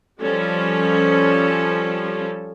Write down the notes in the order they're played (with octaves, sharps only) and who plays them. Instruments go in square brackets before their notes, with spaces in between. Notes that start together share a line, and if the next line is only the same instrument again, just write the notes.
[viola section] F3 G3 C#4 A4